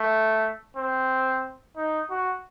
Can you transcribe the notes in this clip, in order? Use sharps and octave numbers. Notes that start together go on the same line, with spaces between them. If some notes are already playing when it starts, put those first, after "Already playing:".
Already playing: A3
C4
D#4
F#4